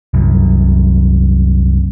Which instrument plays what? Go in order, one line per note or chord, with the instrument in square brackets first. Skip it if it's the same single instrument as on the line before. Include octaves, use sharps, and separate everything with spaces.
[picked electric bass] C2 F#2